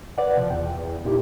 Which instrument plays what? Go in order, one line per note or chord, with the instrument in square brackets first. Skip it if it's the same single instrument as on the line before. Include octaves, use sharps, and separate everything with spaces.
[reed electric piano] B4 D5 F#5
[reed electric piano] B2 [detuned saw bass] F3
[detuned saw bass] E2 [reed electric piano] G5
[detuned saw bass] E2
[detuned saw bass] A#2 [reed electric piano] D#4 E4 G4